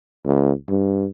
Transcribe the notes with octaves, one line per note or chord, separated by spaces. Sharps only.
C#2
G2